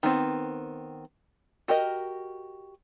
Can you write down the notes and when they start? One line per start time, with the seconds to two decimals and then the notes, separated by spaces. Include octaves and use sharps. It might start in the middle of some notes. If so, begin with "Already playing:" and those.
0.03 D#3 B3 C4
1.68 F#4 G4 A#4 D#5